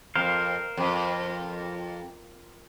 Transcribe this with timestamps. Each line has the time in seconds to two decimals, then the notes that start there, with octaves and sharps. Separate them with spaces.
0.15 F2 A#4 C5 F5
0.77 F2